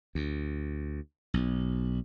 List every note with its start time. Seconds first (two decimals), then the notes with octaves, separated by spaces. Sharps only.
0.15 D2
1.34 B1